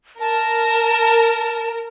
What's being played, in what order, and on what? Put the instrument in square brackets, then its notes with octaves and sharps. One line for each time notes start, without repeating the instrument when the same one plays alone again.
[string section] A#4 [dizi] A5